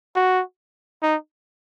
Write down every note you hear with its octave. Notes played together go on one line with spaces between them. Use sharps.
F#4
D#4